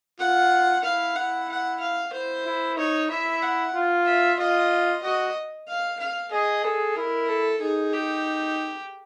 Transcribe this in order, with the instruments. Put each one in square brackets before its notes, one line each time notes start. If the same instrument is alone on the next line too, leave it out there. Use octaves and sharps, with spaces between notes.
[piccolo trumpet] F4 [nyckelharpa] F#5
[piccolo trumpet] E4 [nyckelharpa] F5
[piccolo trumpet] E4 [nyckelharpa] F#5
[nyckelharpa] F#5
F5
[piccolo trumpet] E4 [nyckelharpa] C5
[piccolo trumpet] E4
[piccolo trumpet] D#4 [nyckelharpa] C#5
[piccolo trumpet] E4 [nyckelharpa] E5
[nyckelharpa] F#5
[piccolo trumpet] F4
[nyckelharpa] E5
[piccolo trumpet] F4 [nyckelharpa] D#5
[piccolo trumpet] F#4 [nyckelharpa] D#5
[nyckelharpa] F5
F5
[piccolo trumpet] G#4 [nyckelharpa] D#5
[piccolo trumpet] G#4 [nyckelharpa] A4
[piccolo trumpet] E4 [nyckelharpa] A#4
[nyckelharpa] A4
[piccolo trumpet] D#4 [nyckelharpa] G#4
[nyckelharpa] G4